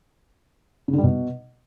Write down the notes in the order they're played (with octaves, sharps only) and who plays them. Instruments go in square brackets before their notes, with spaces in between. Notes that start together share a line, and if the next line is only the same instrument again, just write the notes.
[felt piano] C#3
D3
G3
B2